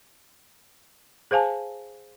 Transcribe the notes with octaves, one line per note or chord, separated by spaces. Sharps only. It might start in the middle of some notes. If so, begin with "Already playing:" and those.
G#4 C5 F5 G#5 A5